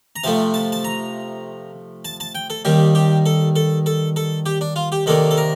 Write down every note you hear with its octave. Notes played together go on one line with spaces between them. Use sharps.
A#5
C3 F3 A3 A5
A5
A5
A#5
A5
A5
G5
A4
D#2 D#3 G3 G4
G4
A4
A4
A4
A4
G4
D4
F4
G4
C3 D#3 A#3 D4 A4
A4
A#4